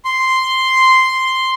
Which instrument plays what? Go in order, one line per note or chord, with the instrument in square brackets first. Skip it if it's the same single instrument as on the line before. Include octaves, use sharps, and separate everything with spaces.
[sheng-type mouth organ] C6